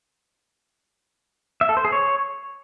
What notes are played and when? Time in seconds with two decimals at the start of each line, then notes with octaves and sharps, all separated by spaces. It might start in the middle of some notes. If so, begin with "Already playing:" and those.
1.61 E5
1.69 A4
1.77 C5
1.85 G#4
1.92 C#5